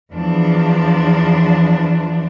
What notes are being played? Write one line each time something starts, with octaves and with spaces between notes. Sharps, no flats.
E2 F3 D4